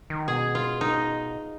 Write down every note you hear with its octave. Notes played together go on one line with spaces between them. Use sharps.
D#3
B2 G#4
F4
D#4